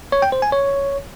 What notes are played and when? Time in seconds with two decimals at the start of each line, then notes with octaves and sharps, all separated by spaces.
0.12 C#5
0.22 G5
0.32 C5
0.42 G#5
0.52 C#5